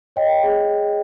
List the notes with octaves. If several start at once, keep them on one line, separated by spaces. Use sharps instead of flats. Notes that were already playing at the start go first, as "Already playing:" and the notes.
C#5 D#5 G5
G#4